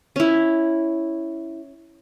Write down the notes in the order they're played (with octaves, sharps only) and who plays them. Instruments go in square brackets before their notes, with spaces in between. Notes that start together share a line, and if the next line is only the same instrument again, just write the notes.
[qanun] C#4 E4